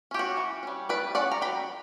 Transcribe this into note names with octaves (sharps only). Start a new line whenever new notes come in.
C#4 G4
F#4
E3
G3 C#4
G3 B4 D5
C#4 D5 F#5
A#5
F#3 G5 B5